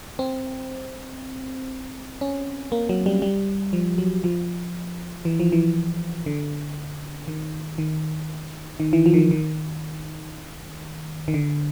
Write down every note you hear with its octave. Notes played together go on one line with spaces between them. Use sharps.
C4
C#4
A#3
F#3
G3
G3
F3
F#3
F3
E3
F3
E3
D3
D#3
D#3
D#3
E3
F3
D#3
E3
D#3
D#3
D3